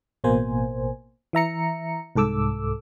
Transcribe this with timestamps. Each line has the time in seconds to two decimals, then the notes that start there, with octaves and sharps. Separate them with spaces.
0.24 A1 B2 A#3 C5 G#5
1.33 E3 E5 A#5 C#7
2.15 C2 G#2 A4 D6 E6